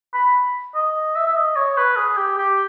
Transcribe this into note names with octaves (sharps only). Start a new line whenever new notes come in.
B5
D#5
E5
E5
D#5
C#5
B4
G#4
G4
G4